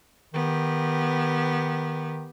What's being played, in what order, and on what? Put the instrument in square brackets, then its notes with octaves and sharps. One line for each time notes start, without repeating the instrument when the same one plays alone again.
[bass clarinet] D#3 [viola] B3 G4